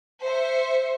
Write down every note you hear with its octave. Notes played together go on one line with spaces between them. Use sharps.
C5 E5 C#7